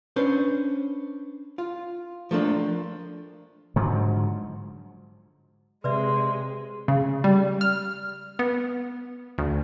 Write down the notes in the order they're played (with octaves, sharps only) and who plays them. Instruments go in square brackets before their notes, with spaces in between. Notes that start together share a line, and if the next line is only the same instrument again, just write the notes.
[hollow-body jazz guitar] C#4 D4 B4 C5
F4
F3 A3 A#3 D4
[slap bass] G#2 D3 F3 F#3
[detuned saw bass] C3 [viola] G#3 [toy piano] B4 D5 E5 [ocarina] C6
[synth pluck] C#3
G3
F6
B3
D2